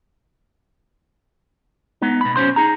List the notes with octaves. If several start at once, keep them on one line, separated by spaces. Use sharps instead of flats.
G#3 B3 D#4
B2 B5
F#2 B2 C#4 C5 C6
D#4 G#4 A#5